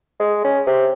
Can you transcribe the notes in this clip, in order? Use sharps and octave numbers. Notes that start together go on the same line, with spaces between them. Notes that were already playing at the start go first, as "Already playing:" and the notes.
G#3
C#4
C3